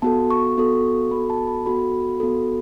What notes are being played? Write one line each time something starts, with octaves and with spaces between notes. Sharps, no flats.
B3 F#4 A4 A5
C#6
B3 F#4 A4
B3 F#4 A4 B5
A5
B5
B3 F#4 A4 B5
B3 F#4 A4